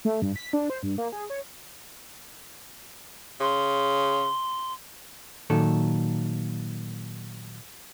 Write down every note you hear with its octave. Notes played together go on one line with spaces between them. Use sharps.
A3
G2
B6
D4
C5
G2
A#3
G#4
C#5
C#3 C6
A#2 D#3 F#3 A4